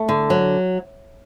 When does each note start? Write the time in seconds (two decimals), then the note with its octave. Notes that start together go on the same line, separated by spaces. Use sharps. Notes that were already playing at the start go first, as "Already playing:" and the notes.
Already playing: A3
0.09 D3
0.30 F#3